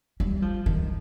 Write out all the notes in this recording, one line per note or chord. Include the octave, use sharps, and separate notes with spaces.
G3
F3
D#3